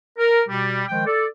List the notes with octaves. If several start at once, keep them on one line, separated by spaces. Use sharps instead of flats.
A#4
B2 G3
D#3 F3 G#3 G5
A4 D5